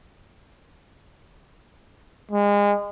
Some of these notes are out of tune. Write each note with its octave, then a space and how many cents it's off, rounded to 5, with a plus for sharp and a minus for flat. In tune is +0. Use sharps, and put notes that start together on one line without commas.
G#3 -30